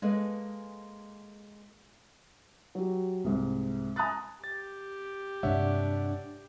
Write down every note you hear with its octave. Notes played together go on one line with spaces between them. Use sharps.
G#3 A#3 G#4 A4 B4
F#3 G4
C2 G#2
G#5 A#5 D#6 F#6 A6
G4 A6
G2 C3 G#3 D4 C#5 E5 F#5